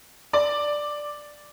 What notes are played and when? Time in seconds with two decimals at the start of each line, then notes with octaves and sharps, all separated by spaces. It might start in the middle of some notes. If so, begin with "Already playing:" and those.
0.33 D5